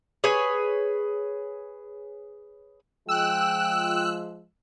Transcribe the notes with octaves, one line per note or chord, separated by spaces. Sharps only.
G#4 B4 C#5 G#5
F3 G#3 F4 G5 E6 F#6